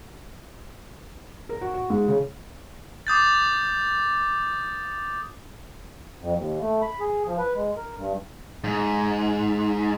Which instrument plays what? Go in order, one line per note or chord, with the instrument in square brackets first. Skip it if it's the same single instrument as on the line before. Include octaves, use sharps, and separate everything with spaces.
[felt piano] A#4
F#4
F#4
G#2
C#3
[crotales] D6 D#6 G6 A6
[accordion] F2
D#2
A3
B5
G#4
F3
B4
G#3
A#4
G2
[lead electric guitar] G#2